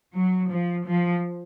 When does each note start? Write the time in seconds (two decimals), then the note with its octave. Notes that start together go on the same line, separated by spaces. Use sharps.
0.14 F#3
0.50 F3
0.86 F3